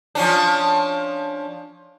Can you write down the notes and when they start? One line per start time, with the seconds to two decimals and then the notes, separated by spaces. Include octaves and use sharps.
0.15 F3 C#4 D4